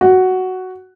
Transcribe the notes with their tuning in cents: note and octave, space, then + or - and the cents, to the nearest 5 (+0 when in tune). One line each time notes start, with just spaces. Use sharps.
F#4 +5